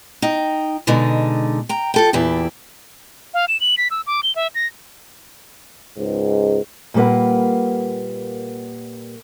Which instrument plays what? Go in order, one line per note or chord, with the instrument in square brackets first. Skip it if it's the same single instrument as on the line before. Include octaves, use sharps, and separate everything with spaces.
[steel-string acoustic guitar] D#4 G5
B2 D3 G#3 D#4
G5 A#5
F3 A4 G5
E2 A#2 E4 G4
[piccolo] F5
E7
F#7
B6
E6
D6
G7
E5
A#6
[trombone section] C#2 G#2
[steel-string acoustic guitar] A#2 G3 A#3 B4 F#5